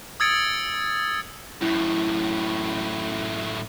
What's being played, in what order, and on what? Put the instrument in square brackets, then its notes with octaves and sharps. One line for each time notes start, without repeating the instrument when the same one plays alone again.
[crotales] D#6 E6 G#6 A6 C#7 D7
[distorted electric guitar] F#2 A2 [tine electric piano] E4